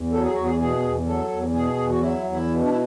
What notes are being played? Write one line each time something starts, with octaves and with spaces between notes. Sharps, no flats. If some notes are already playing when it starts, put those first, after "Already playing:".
Already playing: E2
F#3 A4
G#4
E2 F#4
G#4
B2 G#4
E2
F#3 A4
E2
B2 G#4
E2
F#4
F#3 E4
E2
E4
B2
D4
E4